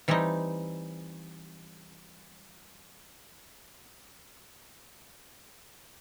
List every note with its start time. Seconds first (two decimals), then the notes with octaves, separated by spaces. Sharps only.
0.08 E3 G3 C4 D#4